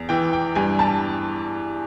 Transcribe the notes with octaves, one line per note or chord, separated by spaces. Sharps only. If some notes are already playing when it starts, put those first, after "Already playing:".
Already playing: E2
E3 G5
G5
G2 G#5
A5